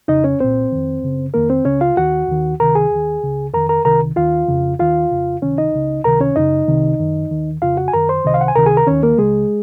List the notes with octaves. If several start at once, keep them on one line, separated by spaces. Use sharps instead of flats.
F2 C#3 D#4 D#5
C#4 C#5
C2 A#2 C4 C5
F2 D#3
F#2 C#3
F2 D#3 A#3 A#4
C4 C5
C#2 C#3 C#4 C#5
F4 F5
D#2 D#3 F#4 F#5
D#2 D#3
C#2 C3 D#3 A#4 A#5
G#4 G#5
D#2 D#3
C#2 C#3
F2 D#3 A#4 A#5
A#4 A#5
C2 C3 D#3 A#4 A#5
D#2 D#3 F4 F5
F2 C#3
D#2 D#3 F4 F5
F2 C#3
C#2 C3 D#3 C#4 C#5
D#4 D#5
C#2 C#3
C#2 C3 D#3 A#4 A#5
C#4 C#5
F#2 C#3 D#4 D#5
C2 C3 D#3
F#2 D#3
D#2 D#3
F2 C#3 F4 F5
F#4 F#5
G#5
F#2 D#3 A#4 A#5
C5 C6
C2 C3 D#3 D#5
F5
F#5
G#5
C#2 C3 D#3 A#4 A#5
G#4 G#5
A#4 A#5
D#2 D#3 C#4 C#5
A#3 A#4
C#2 C#3 G#3 G#4